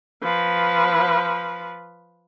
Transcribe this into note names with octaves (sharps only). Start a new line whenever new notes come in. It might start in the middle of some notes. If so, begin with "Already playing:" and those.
F3 B4